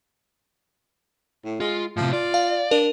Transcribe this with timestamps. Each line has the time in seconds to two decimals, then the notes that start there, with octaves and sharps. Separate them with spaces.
1.45 A2
1.60 G#3 F4
1.97 A2 C3 F3
2.13 F4 D5
2.34 F5
2.71 D4 A#4